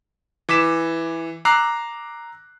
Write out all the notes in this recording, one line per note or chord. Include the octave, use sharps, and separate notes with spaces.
E3 D6 B6 E7
A#5 D6 E6 F#6 C7